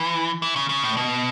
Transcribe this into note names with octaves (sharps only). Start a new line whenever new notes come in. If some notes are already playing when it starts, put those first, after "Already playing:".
Already playing: E3
E3
C#3
C#3
A2
B2